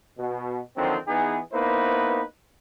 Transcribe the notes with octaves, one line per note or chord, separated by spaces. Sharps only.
B2
D3 D#3 F3 F#3 C4
E3 B3 D#4 G#4
A#3 B3 D#4 E4 B4 C5